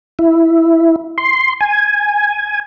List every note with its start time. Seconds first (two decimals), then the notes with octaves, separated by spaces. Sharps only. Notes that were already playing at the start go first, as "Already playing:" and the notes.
0.19 E4
1.18 C6
1.61 G#5